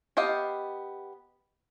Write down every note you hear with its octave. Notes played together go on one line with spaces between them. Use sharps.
B3 G4 D#5 F5